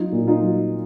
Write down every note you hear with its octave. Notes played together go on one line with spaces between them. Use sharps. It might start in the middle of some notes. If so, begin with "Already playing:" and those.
Already playing: F#3 D#4 F4
A#2
D#4 F4
F#3